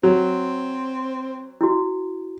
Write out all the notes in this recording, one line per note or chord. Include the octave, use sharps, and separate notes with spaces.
F#3 C4
E4 F#4